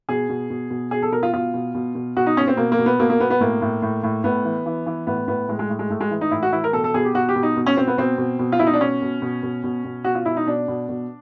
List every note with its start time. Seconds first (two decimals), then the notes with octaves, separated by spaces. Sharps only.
0.09 B2 G#4
0.29 B2
0.50 B2
0.71 B2
0.91 B2 G#4
1.02 A4
1.12 B2 A#4
1.23 F4
1.33 B2 F4
1.54 B2
1.75 B2
1.95 B2
2.17 B2 F#4
2.26 D#4
2.37 B2 C#4
2.48 C4
2.57 B2 A#3
2.72 A#3
2.79 B2
2.86 B3
2.99 B2 A#3
3.10 A#3
3.20 B2 B3
3.30 B3
3.40 A2 A#3
3.61 A2
3.82 A2
4.03 A2
4.24 A2 B3
4.45 E3
4.66 E3
4.86 E3
5.07 A2 B3
5.28 A2 B3
5.49 A2 G#3
5.59 G#3
5.70 A2
5.79 G#3
5.90 A2 A3
6.01 G#3
6.11 E3
6.21 D#4
6.31 A2 E4
6.43 F#4
6.52 E3 E4
6.64 A#4
6.73 B2 A4
6.84 A4
6.94 B2 G#4
7.05 G4
7.14 B2 F#4
7.29 G4
7.36 B2
7.43 D#4
7.57 B2
7.66 C#4
7.77 B2 C4
7.87 B3
7.98 B2 C4
8.18 B2
8.39 B2
8.52 F4
8.59 B2 E4
8.66 D#4
8.73 D4
8.81 B2 C#4
9.02 B2
9.22 B2
9.43 B2
9.64 B2
9.85 B2
10.04 B2 F#4
10.15 F4
10.25 B2 E4
10.36 D#4
10.46 B2 D4
10.68 B2
10.89 B2